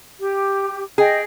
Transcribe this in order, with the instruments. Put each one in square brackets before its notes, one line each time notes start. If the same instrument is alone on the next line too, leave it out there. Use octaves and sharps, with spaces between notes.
[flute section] G4
[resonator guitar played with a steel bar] G#4 [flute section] D#5 G5